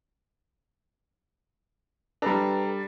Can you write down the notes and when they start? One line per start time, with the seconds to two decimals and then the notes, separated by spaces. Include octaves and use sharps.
2.22 G3 D4 A4 B4 A#5